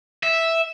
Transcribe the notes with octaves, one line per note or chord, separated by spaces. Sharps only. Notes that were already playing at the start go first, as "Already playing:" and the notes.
E5